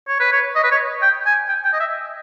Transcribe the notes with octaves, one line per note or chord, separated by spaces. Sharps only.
C#5
B4
C#5
D#5
B4
C#5
G5
G#5
G5
G5
D#5
E5